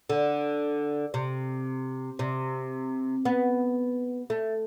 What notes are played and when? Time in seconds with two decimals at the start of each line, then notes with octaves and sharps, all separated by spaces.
0.10 D3
1.14 C3
2.19 C3
3.25 B3
4.30 A3